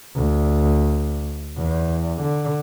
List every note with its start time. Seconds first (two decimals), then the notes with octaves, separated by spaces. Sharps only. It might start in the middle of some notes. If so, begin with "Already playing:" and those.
0.15 D2
1.58 E2
2.22 D3